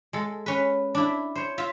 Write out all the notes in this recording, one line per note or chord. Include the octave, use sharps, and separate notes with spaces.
G#3 A4
C#4 B4
D4 E4
C5 C#5
F4 E5